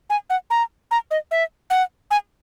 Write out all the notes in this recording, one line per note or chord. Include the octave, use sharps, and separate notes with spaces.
G#5
F#5
A#5
A#5
D#5
E5
F#5
G#5